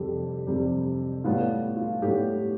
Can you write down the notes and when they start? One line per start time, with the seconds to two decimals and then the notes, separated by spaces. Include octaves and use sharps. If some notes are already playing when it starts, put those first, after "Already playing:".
Already playing: F2 C3 G3 G4 A4
0.47 F2 C3 G3
1.24 A2 G3 B3 F4
1.77 F4
2.02 A2 G3 B3 G4